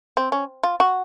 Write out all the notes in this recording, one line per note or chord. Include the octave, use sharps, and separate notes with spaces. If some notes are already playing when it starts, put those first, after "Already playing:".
C4
C#4
F4
F#4